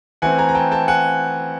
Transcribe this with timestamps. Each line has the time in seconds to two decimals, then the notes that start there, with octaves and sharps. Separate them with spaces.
0.22 E3 A3 C4 F#5 G#5
0.38 G#5 A#5
0.49 A#5
0.55 G5 A5
0.71 G5 A5
0.88 F#5 G#5